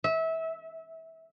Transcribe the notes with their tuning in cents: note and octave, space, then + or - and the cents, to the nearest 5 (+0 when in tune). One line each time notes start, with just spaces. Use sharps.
E5 -25